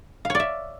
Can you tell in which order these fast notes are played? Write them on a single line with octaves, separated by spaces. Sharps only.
F5 C#5 D5 E5